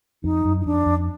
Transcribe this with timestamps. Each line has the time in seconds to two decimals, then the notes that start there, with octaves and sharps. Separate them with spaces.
0.24 F2 D#4
0.45 F#2
0.61 D#4
0.65 F2 D4
0.86 F2